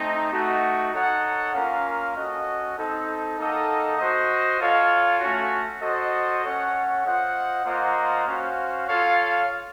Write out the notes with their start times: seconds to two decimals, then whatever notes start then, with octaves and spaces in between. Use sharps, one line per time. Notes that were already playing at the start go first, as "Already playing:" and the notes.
Already playing: A3 C4 D#4
0.32 A3 D#4 F#4
0.92 D#4 A4 C#5 F#5
1.54 A#3 C#4 F4 A#4 F5
2.15 C#4 F#4 A4 D#5
2.76 C4 D#4 A4
3.37 A#3 D#4 A4 D#5 F#5
3.98 F#4 C5 D#5
4.60 F4 A4 C#5 F5
5.20 A3 C#4 F#4
5.81 F#4 A4 C5 D#5
6.43 C#4 A4 C#5 F#5
7.03 F4 C5 D#5 F#5
7.64 A#3 F4 C5 D#5 F#5
8.26 C#4 F#4 C5 F5
8.86 F4 A4 C#5 F5